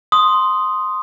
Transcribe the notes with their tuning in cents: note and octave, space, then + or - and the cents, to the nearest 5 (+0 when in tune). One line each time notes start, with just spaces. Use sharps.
C6 +0 D#6 +0